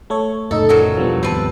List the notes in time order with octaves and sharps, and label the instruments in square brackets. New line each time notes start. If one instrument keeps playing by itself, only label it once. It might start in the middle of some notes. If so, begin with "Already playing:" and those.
[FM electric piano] A3 A4 C#5
[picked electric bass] F1 A2 C#3 [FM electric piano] A3 D#4 D#5 [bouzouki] A4
[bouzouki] A#2 F#3 A4
[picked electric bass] E2 B2 D4 [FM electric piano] F3 G3 B3
[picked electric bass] D#2 G#2 D#3 [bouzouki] C4 B4 A5